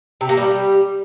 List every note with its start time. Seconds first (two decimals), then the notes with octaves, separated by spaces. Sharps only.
0.21 C3
0.29 A#3
0.37 G3